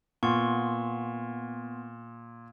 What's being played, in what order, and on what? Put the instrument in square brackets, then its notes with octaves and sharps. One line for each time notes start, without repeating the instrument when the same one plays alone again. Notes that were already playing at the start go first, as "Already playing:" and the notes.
[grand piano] A#2 [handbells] B3 C6 C#6